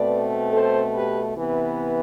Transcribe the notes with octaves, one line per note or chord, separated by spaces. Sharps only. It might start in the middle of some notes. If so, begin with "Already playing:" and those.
Already playing: B2 A3 C4 B4 D5
A4 C5
G4 B4
C3 E3 B3